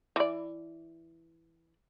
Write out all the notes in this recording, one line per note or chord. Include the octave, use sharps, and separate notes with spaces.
E3 D5